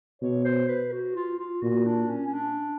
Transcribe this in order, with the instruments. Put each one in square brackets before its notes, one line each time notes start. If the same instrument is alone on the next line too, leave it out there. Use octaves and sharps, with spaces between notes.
[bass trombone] B2 [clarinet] C#5
[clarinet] C5
B4
F#4
F4
F4
[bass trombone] A#2 [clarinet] F#4
[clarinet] D4
C#4
C#4
D4